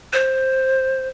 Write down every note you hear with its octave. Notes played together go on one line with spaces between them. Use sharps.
C5